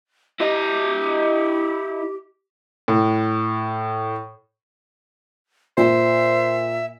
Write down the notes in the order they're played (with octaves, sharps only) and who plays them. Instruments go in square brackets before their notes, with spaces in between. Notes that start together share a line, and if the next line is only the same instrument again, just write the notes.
[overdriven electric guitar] E4 D#5 [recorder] G4
[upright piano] A2
[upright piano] A#2 [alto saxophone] C5 [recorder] E5